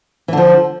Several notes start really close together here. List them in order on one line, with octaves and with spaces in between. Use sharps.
E3 D3 F3